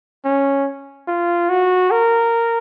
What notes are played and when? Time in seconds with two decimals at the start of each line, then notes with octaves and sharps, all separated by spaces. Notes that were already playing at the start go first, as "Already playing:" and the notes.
0.25 C#4
1.08 F4
1.49 F#4
1.91 A#4